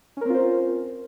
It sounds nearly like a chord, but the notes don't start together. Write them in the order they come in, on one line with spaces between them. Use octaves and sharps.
C#4 A#4 C4 F4 C5